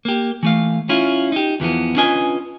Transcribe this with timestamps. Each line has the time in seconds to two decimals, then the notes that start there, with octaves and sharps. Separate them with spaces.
0.05 A#3 G4
0.43 E3 A3 F5
0.89 C#4 E4 F4
1.32 D#4 G4
1.60 E2 E3 F3 B3
1.96 C#4 D4 F4 B4 D#5 G#5